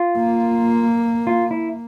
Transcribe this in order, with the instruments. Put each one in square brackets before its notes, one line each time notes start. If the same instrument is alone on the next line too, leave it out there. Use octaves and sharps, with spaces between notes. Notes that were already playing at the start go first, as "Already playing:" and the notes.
Already playing: [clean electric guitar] F4
[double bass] A#3
[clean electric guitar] F4
E4